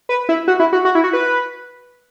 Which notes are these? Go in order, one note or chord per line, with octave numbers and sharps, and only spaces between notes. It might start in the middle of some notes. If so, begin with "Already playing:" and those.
B4
E4
F#4
E4
F#4
F#4
E4
F#4
B4